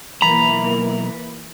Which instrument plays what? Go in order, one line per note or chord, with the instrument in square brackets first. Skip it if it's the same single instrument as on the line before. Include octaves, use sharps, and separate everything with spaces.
[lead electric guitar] B1 A#5 [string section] E3 A#3 [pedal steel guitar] B5